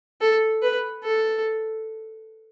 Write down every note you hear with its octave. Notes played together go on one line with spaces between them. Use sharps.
A4
B4
A4